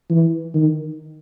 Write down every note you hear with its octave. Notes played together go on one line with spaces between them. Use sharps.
E3
D#3